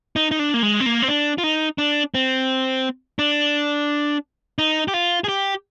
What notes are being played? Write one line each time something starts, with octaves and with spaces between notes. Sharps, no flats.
D#4
D#4
D4
A#3
G#3
C4
A#3
C4
D4
F4
D#4
D4
C4
D4
D#4
G4
F4
G#4
G4